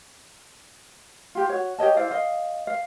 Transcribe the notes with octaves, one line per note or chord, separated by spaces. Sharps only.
F4 G4
F#4 C#5
G4 C#5 D#5 A5
E4 C5 D5 F5
D#5 F5
F5